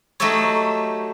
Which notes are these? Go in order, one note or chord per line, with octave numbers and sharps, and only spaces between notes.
F#3 A3 D#4 G4 A4 C#5